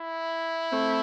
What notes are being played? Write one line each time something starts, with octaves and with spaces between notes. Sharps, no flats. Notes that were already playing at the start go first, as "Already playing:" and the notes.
Already playing: E4
A3 C4